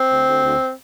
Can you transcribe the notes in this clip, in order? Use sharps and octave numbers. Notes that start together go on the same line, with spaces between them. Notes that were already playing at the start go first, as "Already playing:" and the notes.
Already playing: C4
D2
D2
D2